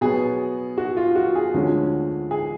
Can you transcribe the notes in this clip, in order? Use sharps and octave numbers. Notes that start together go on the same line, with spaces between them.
B2 F#3 B3 G#4
F#4
F4
F#4
G#4
D2 D3 F3 G#3 C#4
G#4